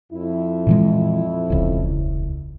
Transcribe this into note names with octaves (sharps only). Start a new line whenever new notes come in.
F2 E4
A#2 E3 G#3
E1 C#2